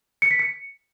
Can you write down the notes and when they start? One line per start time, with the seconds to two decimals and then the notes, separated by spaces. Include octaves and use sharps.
0.22 C#7
0.31 B6
0.39 C#7